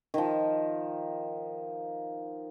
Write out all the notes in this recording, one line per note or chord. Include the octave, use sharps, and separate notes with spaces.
D#3 F3